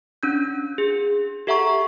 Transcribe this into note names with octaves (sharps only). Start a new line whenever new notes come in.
C#4 D4 G6
G#4
G4 A4 E5 F#5 A#5 C#6